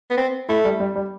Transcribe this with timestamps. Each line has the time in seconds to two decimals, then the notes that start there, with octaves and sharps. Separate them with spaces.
0.11 B3
0.17 C4
0.49 A3 E4
0.64 G3
0.80 G3
0.96 G3